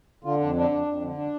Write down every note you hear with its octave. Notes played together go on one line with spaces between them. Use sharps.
D3 F4
F2 D4
D3 D4
F2 D4
F2
D3
D4